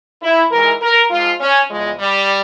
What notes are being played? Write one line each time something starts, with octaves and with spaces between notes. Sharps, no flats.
E4
G#2 E3 A#4
A#4
G#2 F3 F4
C#4
E2 C#3 F3 G#3
G3